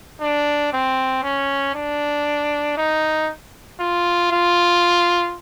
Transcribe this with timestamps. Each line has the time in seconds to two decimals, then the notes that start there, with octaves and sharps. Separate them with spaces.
0.21 D4
0.73 C4
1.24 C#4
1.75 D4
2.77 D#4
3.80 F4
4.32 F4